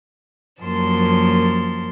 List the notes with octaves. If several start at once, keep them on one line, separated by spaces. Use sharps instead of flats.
F#2 F3 A#3 A5 C6